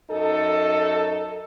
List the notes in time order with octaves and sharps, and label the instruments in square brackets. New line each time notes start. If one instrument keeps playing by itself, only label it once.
[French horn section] F#2 D#4 A4